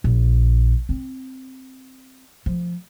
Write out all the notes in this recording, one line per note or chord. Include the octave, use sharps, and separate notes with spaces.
A#1
C4
F3